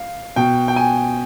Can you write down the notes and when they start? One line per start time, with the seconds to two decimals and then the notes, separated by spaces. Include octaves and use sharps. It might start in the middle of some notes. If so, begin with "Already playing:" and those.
Already playing: F5
0.36 B2 G5
0.68 G5
0.76 G#5